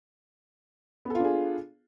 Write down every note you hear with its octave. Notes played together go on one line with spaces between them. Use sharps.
B3 D4 F4 G#4 A4